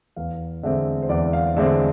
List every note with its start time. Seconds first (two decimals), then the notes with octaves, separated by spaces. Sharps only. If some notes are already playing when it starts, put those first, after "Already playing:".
0.16 E2 F5
0.63 D3 G#3 C4 E5
1.02 C5
1.09 E2 D5
1.33 F5
1.57 D3 G#3 C4 E5